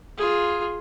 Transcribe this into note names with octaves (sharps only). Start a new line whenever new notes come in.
F4 G#4